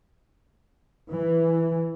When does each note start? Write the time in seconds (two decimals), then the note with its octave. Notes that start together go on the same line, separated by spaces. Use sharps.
1.12 E3